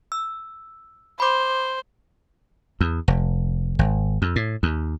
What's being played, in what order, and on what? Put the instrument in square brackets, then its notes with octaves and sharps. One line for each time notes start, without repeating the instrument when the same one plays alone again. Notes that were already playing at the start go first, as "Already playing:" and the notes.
[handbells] E6
[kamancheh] C5 [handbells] B5 D6
[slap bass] E2
F1
G#1
F2
A2
D#2